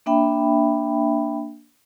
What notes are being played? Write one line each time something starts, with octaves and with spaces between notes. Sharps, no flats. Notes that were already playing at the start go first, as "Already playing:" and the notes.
A#3 D4 E5 G5 B5